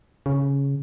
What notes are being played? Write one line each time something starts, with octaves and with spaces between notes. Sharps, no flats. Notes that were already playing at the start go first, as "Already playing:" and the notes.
C#3